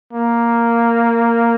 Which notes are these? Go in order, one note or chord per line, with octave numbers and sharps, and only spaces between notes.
A#3